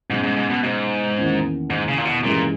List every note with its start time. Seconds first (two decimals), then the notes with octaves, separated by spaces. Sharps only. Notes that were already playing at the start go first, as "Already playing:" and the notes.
0.10 G#2 B2 G#3 C#4
0.24 G#2
0.37 G#2
0.50 B2
0.63 G#2
1.17 E2 D#3 A#3 C#4
1.70 G#2
1.88 C#3
1.98 A#2
2.05 B2
2.23 G2 A#2 E3 G#3 C#4 E4